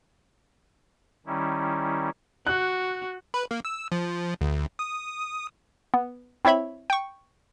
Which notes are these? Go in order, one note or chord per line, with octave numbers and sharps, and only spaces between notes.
D#3 G3 C#4 E4
F#4 F#6
B4
A#3
E6
F3
D2
D#6
B3
C4 E4 C#5 E5 B5
G5 C#6